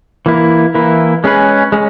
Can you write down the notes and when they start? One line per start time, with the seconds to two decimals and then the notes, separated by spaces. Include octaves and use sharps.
0.26 E3 A#3 E4
0.75 E3 A#3 E4
1.24 G#3 C#4 G#4 B4
1.72 G#3 C#4